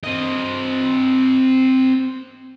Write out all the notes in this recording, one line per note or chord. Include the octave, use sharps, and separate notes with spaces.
C4 D#5